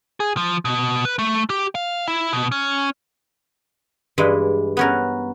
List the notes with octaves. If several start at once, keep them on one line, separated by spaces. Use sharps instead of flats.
G#4
F3
B2
B4
A3
G4
F5
E4
B2
C#4
G2 E3 G#3
B3 C#4 A#4